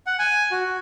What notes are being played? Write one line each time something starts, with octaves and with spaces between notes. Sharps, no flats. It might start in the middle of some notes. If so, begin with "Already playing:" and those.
F#5
G#5
F#4